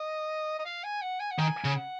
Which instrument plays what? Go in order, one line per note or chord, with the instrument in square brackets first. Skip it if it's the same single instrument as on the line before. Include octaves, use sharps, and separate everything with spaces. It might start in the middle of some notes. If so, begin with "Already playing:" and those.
Already playing: [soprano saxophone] D#5
D#5
F5
G#5
F#5
G#5
F#5
[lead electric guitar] D#3 [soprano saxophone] G#5
[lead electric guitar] C#3
[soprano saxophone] F#5